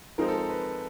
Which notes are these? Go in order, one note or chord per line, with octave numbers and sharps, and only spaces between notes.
F3 G#3 C4 D#4 A#4
A4
A#4
B4